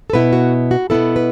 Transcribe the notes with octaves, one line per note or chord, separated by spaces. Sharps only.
A4
B2 B3 E4 B4
F#4
F#4
B2 B3 E4 A4
B4